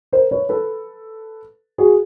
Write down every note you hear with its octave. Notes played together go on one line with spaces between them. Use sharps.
A#4 C5
B4 C#5
A4 B4
F#4 G#4